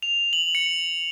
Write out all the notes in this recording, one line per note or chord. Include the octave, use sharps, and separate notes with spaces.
F7
F#7
C#7